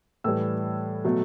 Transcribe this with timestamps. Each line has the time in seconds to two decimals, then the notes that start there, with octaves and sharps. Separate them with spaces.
0.24 A2 E3 G3 E6
1.05 B2 F#3 A3